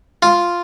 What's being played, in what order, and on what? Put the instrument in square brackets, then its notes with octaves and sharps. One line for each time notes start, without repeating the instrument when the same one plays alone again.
[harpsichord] F4